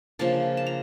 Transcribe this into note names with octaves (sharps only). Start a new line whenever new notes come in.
C#3 F3 A#3 D4 A5
A5
A#5